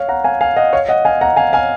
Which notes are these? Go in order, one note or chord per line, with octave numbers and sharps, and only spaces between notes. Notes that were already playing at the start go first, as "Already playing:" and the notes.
Already playing: C#5 F5
F#5 A#5
F5 G#5
F5 G#5
D#5 F#5
C#5 F5
D#5 F#5
F5 G#5
F#5 A#5
F5 G#5
F5 G#5